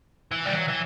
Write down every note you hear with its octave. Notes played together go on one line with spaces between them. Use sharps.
E3
G3
F#3
E3